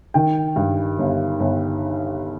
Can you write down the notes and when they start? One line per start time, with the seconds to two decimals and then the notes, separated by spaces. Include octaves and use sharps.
0.14 D#3 G5
0.56 G2
0.98 G1
1.40 G1